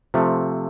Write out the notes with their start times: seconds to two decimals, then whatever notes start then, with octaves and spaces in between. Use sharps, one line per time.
0.14 C3 F3 A3